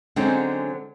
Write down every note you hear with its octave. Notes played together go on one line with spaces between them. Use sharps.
D3 F#3 G#3 C4 C#4 D#4